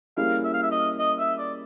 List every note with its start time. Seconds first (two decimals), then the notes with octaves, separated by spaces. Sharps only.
0.17 G3 A#3 C#4 E4 G#4 F5
0.44 E5
0.54 F5
0.62 E5
0.71 D#5
0.99 D#5
1.19 E5
1.38 D5